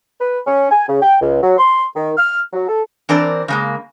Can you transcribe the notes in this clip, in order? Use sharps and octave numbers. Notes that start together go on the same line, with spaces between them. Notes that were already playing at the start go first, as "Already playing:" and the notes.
B4
C#4
G#5
C#3
G5
C#2
F#3
C6
D#3
F6
F#3
A4
E3 C4 D4 A#4 C5 D5
C#3 G#3 A#3